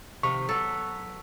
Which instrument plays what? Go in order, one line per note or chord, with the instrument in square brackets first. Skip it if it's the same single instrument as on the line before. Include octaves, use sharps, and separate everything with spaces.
[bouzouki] C3 D#3 F3 [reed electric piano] C#6
[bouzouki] F#3 B3 [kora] A4